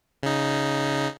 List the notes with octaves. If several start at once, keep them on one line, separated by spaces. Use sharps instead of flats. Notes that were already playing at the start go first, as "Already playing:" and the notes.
C#3 D#4